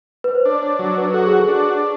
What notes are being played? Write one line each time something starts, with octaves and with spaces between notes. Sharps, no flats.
B4
C5
D4 C#5
C#5
F#3
B4
F#4 A4
G#4
A4
D4